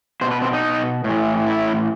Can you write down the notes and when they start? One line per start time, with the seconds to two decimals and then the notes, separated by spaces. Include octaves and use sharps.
0.21 B2 C5
0.31 B4
0.42 C4
0.53 D#4
1.04 A2 E3
1.47 E4